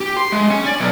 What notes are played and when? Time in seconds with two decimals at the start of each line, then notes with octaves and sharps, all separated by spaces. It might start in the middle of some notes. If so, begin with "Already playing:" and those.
0.01 G4
0.17 C6
0.32 G#3
0.51 C#4
0.66 D5
0.79 B1